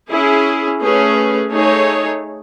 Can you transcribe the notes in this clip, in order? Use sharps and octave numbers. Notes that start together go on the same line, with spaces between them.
C#4 E4 G#4
A3 C#4 G#4 B4
A3 D#4 G#4 C#5